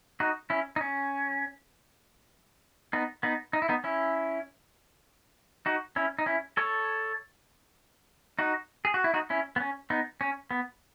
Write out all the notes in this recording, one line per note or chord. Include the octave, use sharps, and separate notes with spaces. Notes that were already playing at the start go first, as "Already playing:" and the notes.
D#4 F#4
C#4 E4
D#4
C#4
B3 D#4
B3 D#4
D#4
E4
B3 D#4
C#4 E4
D#4 F#4
C#4 E4
D#4
C#4 E4
A4 C#5
D#4 F#4
G#4
F#4
E4
D#4 F#4
C#4 E4
B3
C#4
B3 D#4
C#4
B3